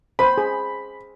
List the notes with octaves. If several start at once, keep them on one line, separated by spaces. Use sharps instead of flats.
C5 B5
G#4